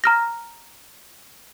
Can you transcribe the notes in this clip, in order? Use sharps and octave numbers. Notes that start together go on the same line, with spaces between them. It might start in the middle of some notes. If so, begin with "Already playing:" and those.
A#5 F6 A#6